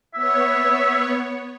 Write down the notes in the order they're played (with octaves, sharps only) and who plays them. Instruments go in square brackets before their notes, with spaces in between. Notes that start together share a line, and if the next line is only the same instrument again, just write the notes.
[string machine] B3 C#5 [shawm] E5